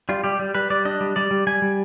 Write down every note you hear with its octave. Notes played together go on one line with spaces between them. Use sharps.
G3 F4
G3 G4
G3
G3 B4
G3 D5
D4 D#5
G3
G3 D5
G3
G3 G#5
G3